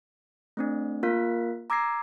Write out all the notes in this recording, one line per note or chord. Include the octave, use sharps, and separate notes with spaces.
A3 C4 D4
A#3 F4 A#4 F5 F#6 B6
A#5 D6 E6 G#6 A#6 C7